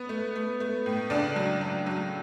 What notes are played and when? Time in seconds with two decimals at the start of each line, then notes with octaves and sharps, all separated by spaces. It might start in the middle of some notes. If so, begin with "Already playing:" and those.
Already playing: B3 B4
0.09 A3
0.35 A3
0.60 A3
0.86 A2
1.10 C#3 D4 D5
1.36 F#3
1.61 F#3
1.86 F#3